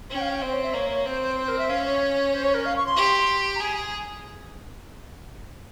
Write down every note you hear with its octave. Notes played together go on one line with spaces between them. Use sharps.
C#4 G5
F5
G5
C4 C5
C#5
E5
A#3 C#5
C#5
C4 C5
C5
C5
A#4
E5
C#4 F5
C#5
C5
C#5
A#4
F5
C#6
C6
G4
A#5
G#4 G#5
G#5